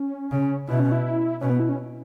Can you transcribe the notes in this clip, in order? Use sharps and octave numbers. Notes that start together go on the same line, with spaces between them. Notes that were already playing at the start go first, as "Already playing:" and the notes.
Already playing: C#4
C#3
B2 E4
C#4
E4
B2 C#4
B3
E4
C#4